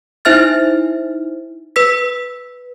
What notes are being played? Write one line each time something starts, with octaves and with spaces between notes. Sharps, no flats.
D#4 E4 C5 E5 F6 A6
B4 E6 B6